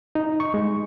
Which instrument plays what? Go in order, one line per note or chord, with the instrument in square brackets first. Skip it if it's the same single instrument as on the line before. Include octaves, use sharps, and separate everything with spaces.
[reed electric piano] D#4
C#6
G#3